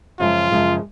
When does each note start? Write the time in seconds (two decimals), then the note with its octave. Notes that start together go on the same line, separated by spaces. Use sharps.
0.20 F#2 C#3 F3 G#3 F4
0.51 F#2 C#3 F3 G#3